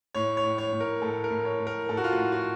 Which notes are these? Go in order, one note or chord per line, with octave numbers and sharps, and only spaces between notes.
A2 C#5
C#5
A2
C#5
A2
A#4
A2 A4
A#4
A2
C#5
A2
A#4
A2 A4
F#4
F4
A2 F#4
F#4